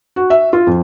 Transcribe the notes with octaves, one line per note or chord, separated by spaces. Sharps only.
F#4
E5
F4
F2